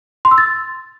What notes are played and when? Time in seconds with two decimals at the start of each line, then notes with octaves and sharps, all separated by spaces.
0.25 C6
0.31 E6
0.38 A6